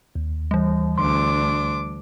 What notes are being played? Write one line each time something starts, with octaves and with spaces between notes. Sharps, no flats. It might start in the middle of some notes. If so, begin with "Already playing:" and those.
D#2
E3 G3
D2 D4 C6 D6